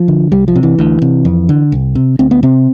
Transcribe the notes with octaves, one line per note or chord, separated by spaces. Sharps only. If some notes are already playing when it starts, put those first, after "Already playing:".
Already playing: F3
D3
C2 G3
F3
C3
E3
D2
C3
F2
D3
C2
C3
D2 C4
B3
C3 C4